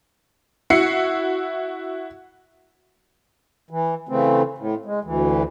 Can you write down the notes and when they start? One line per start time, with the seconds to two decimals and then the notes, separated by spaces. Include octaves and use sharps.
0.70 E4 F#4 C7 C#7
3.71 E3
4.09 C#3 E3 A3 C4
4.58 A2
4.85 G#3
5.04 D2 E3